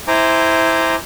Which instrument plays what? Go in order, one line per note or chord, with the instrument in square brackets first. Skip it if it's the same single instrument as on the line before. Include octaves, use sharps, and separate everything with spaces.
[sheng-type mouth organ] E4 C5 G#5 A#5 D6